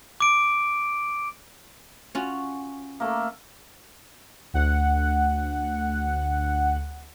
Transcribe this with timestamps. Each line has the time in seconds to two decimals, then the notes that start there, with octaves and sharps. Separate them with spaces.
0.20 D6 D7
2.15 C#4 F4 F#4
3.00 A3 A#3
4.53 D2 F#5